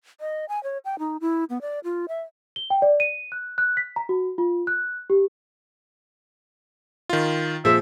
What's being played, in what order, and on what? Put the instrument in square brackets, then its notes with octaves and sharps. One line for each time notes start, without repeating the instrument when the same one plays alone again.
[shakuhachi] D#5
G#5
C#5
G5
D#4
E4
B3
D5
F4
E5
[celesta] G7
G5
D5
D#7
F#6
F#6
B6
A#5
F#4
F4
F#6
G4
[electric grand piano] D#3 F4
[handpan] A#2 G#4 C5 [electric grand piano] F3 [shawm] E5